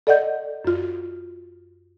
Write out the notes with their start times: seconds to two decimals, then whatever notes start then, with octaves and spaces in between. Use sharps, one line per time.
0.07 A4 D5 D#5 F#5 G6
0.65 F#2 F4